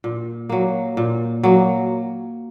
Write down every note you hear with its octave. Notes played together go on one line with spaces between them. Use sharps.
A#2
F#3 A#3
A#2
F#3 A#3